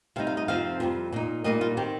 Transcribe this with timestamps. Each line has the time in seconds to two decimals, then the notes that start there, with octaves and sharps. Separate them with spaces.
0.16 C3 G3 D#4 F5
0.27 F5
0.37 D#5
0.48 F2 C3 F3 C4 D#4 F5
0.80 F2 C3 G3
1.12 A#2 A#3 D#4
1.44 A#2 G3 A#3 D#4 D#5
1.61 F4
1.77 D#3 C4 G4